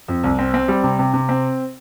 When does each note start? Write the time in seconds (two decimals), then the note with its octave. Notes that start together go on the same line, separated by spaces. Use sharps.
0.08 F2
0.24 C2
0.39 C4
0.54 C4
0.68 G3
0.84 C3
0.99 C3
1.14 C3
1.29 C4